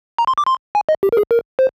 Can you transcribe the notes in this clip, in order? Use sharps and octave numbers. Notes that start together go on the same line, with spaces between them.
A#5
C6
D6
C6
G#5
D#5
G4
A#4
G#4
A#4
C5